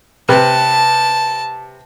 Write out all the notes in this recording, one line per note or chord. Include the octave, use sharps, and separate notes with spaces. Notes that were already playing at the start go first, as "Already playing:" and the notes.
C3 B4 G5 A5